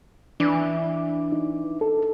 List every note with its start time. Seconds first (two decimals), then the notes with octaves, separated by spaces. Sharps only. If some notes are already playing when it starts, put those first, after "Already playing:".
0.40 E3 D4 D6
1.32 D#4
1.81 A4